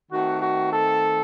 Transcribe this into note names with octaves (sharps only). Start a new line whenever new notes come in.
D#3 A3 C4 D#4 F#4
F#4
A4